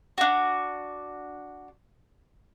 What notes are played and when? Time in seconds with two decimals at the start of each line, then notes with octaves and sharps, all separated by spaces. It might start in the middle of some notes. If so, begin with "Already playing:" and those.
0.18 D4 F#4